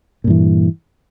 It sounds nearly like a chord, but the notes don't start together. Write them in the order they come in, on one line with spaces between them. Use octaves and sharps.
A#2 G2 E3